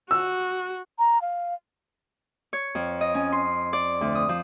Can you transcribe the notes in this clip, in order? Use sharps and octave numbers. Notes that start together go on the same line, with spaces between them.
F#4 E6
A#5
F5
C#5
F2
D#5
C#4
C6
D5
D2
D#6
F3